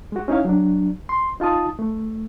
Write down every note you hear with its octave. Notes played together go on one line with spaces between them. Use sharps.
G#3 F#4
C#4 D#4 E4 C#5 F5
F#3 D4
C6
D#4 F4 A5 D#6
A3